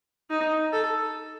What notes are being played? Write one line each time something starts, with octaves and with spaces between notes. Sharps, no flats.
D#4
A4